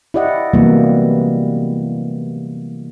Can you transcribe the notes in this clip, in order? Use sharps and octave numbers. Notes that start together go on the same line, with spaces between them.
E4 G4 D5 D#5 F#5
C3 E3 F#3 G3 A#3 B3